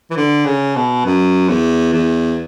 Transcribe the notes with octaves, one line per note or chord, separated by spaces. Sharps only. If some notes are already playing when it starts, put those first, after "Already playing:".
E3
D3
C#3
B2
F#2
E2
E2